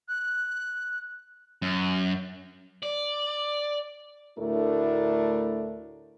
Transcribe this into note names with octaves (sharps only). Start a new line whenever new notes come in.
F#6
F#2
D5
D2 A2 A3 D4 E4 A#4